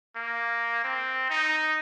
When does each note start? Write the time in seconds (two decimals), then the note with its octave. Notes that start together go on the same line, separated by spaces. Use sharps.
0.16 A#3
0.84 C4
1.30 D#4